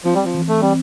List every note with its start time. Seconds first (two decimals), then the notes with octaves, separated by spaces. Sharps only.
0.05 F3 C4
0.15 G3
0.24 F3
0.35 E3
0.48 A3
0.61 G3 C4